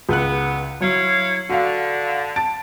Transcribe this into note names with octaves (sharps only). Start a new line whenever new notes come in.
C#2 B3 F#6
F#3 E4 C#5 F5
D3 F#4 F5
A5 A6 D7